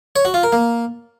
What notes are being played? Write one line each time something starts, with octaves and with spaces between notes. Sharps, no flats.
C#5
F#4
F4
A#4
A#3